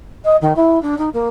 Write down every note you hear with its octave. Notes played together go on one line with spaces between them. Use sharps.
D#5
D#3
E4
D4
D#4
A#3